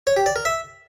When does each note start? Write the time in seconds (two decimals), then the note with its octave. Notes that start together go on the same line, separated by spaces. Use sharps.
0.07 C#5
0.17 G4
0.26 D5
0.36 A#4
0.45 E5